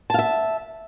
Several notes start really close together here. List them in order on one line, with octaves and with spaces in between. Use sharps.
A5 F5 E5